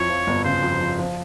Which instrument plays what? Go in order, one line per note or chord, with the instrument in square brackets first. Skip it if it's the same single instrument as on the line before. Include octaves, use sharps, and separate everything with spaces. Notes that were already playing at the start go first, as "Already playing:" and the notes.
Already playing: [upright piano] F2 E4 [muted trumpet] C#5
[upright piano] F3
G1
[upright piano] C#3 [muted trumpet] C5
[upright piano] F2
F3
F3